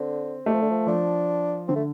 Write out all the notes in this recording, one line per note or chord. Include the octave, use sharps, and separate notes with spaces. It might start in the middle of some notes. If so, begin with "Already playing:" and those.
Already playing: D3 C4
G3 A3
F3
D3
F3
F3 D4
D3 C4
A3